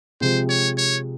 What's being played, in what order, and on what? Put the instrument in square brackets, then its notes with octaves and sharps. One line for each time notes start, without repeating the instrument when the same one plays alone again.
[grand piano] C3 F3 G#3 C4 [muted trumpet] C5
[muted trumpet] C#5
C#5